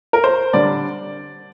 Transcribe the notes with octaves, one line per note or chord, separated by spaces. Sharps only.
A#4
C5
D3 G3 D4 D5